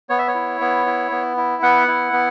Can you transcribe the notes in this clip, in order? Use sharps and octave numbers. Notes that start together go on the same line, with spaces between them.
B3 C#5
E5
C#5
E4
B3
E4
B3
E4
B3 F#5
E4
B3